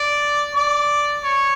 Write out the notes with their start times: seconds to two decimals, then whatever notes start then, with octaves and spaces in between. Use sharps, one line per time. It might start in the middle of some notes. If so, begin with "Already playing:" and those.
Already playing: D5
0.54 D5
1.24 C#5